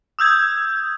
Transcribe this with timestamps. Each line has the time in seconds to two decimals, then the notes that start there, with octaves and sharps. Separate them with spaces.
0.19 D#6 E6 G6 G#6